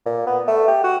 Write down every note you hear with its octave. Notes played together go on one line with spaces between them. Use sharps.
A#2
B3
A3
G4
F#4